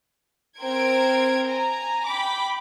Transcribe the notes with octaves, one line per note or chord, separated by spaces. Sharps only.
C4 A#4 C5 G5 G#6 D7
G#5 A#5
G5 B5 D6